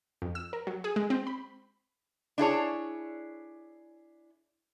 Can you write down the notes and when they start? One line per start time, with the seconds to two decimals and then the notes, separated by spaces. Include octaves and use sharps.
0.22 F2
0.35 E6
0.53 A#4
0.67 F#3
0.84 G#4
0.96 G#3
1.10 C4
1.27 B5
2.38 D4 E4 G#4 C#5